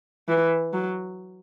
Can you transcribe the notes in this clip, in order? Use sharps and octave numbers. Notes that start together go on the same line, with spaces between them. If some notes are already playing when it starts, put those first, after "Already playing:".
E3
F#3